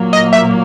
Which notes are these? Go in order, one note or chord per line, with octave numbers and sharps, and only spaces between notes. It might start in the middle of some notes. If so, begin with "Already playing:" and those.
Already playing: A#2 F#3 A#3
D#5
E5